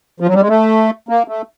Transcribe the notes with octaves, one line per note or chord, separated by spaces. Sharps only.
F3
F#3
G3
G#3
A3
A#3
A3